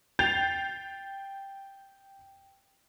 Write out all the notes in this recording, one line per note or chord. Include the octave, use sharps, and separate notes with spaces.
G5 G6 A6 C7 F7